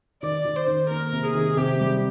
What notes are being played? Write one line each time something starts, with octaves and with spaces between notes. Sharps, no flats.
D#3 D5
D#3
C5
D#3
A#3 A#4
C3
G#4
D#3
C3 G4
G3